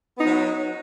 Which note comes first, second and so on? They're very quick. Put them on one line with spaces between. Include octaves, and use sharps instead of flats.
B3 D#4 F#3